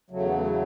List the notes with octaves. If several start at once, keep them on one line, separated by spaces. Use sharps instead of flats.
E2 C#3 F#3 A3
B3
A3